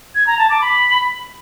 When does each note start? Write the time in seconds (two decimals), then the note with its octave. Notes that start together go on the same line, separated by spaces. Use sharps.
0.15 G#6
0.27 A#5
0.38 A5
0.50 D6
0.62 B5